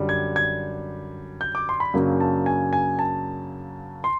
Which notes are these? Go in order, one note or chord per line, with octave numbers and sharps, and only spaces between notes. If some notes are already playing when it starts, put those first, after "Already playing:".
Already playing: F#2 D3 G3
G#6
G#6
G6
D6
C6
B5
F#2 C#3 F#3 A#3 D4
A5
G#5
G#5
A5
C6